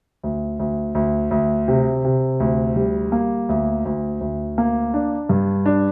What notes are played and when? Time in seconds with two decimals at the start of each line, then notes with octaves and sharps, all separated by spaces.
0.23 D2
0.59 D2
0.95 D2
1.31 D2
1.68 C3
2.05 C3
2.40 D2
2.76 G3
3.12 A#3
3.49 D2
3.85 D2
4.21 D2
4.58 A#3
4.94 D4
5.29 G2
5.66 D4